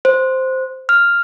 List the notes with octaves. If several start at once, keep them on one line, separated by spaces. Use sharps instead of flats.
C5
F6